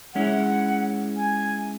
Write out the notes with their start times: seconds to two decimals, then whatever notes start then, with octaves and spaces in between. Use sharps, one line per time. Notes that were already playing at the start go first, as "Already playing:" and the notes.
0.14 G#3 C#4 E4 F#5
1.16 G#5